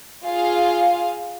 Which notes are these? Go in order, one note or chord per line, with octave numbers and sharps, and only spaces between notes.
F4 G#4 F5